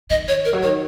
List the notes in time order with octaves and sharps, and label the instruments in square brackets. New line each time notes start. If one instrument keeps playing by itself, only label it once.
[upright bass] D#3 [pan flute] D#5
[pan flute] C#5
A#4
[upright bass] F#3
[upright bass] D#3 [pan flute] C#5